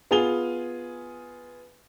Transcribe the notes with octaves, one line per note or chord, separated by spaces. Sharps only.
B3 F4 G#4 G#5 F7 G7